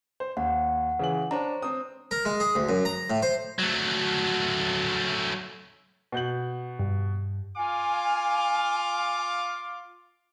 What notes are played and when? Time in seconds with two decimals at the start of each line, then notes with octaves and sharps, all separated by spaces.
0.20 C5
0.37 D#2 F#5
0.99 C#3 E3 F#7
1.31 D4 C5 C#5 A#5
1.62 C4 D#6
2.11 A#4
2.25 G#3
2.40 G#4
2.55 D2
2.69 F#2
2.85 A#5
3.10 A2
3.22 C5
3.59 F#3 A3
6.12 B2 G6 F#7
6.79 G2
7.57 F4 F5 G#5 D6